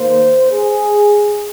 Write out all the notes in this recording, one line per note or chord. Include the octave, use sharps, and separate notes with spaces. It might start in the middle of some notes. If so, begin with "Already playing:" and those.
Already playing: D#3 A#3 C5
G#4